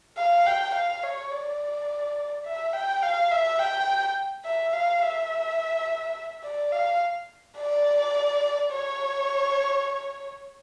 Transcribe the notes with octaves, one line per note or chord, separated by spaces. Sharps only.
F5
G5
F5
C#5
D5
E5
G5
F5
E5
G5
E5
F5
E5
D5
F5
D5
C#5